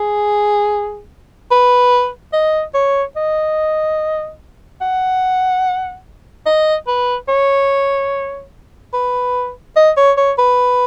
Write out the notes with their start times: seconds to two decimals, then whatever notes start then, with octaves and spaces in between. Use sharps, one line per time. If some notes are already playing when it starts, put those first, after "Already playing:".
Already playing: G#4
1.51 B4
2.33 D#5
2.74 C#5
3.16 D#5
4.81 F#5
6.46 D#5
6.87 B4
7.28 C#5
8.93 B4
9.76 D#5
9.97 C#5
10.17 C#5
10.38 B4